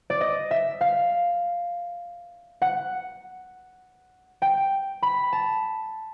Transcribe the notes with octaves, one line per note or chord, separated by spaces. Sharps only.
D5
D#5
E5
F5
F#5
G5
B5
A5